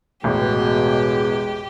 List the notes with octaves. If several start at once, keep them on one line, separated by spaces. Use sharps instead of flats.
A1 E2 B2 G#3 G4